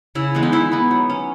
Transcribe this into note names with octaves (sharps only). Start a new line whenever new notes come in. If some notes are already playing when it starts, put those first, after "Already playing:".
C#3 E4
E3 G#3 B3
D#4
E3 E4
B3 D#4
F#3
C#4